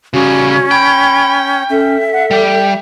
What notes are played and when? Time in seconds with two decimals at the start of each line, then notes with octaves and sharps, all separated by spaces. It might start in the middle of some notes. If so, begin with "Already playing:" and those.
0.14 C#3 G3 C#4 F#4
0.71 G5 B5
1.70 C#4 A4 E5
2.13 F#5
2.31 G3 G5